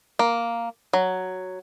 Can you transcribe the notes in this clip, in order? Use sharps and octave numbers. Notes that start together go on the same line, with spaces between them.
A#3
F#3